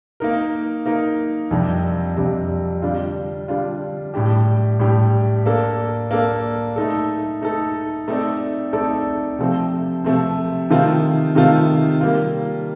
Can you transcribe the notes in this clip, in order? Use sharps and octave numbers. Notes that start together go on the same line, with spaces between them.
A#3 D#4 A#4
A#3 D#4 A#4
F2 C3 G3 D4
F2 C3 G3 D4
D3 G3 D4 F4
D3 G3 D4 F4
A2 G3 D4 G4
A2 G3 D4 G4
A#3 D4 A4
A#3 D4 A4
A3 D#4 A4
A3 D#4 A4
A3 C4 D#4 A4 D5
A3 C4 D#4 A4 D5
C3 F3 A3 C4
C3 F3 A3 C4
C3 D#3 A3 C4 F4
C3 D#3 A3 C4 F4
G3 A#3 F4